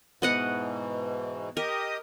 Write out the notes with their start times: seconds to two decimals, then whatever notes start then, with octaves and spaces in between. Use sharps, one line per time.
0.22 G#2 B2 E3 B3 D#5 F#5
1.57 G4 A#4 D#5 D#6